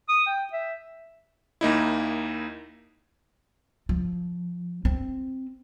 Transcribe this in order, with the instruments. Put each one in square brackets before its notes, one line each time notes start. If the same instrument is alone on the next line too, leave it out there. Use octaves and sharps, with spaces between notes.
[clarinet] D#6
G5
E5
[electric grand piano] D#2 A#3 D#4 E4
[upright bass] F3
C4